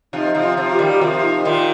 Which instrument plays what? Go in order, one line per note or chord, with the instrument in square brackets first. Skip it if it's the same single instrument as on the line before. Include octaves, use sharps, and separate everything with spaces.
[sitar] C3 F3 [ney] D#4
[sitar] C3 F3
[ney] F4
[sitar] C3 F3
[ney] G4
[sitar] D#3 G3
[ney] G4
[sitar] C3 F3 [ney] F4
[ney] D#4
[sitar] A#2 D#3 [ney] F4